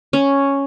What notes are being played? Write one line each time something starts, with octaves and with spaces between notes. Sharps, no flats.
C#4